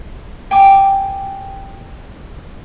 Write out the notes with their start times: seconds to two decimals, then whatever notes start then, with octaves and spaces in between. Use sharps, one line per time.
0.51 G5 G#5 D6